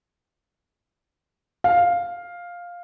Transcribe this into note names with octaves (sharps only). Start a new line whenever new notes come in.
F5